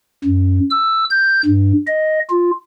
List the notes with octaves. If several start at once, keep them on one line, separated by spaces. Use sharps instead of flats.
F#2
E6
G6
G2
D#5
F4